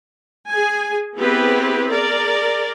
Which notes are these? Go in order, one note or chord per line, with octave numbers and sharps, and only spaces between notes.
G#4 G#5
B3 C4 E4 G4 G#4 B4
G#4 A#4 D5